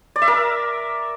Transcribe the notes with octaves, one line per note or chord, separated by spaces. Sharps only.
D5
E5
A#4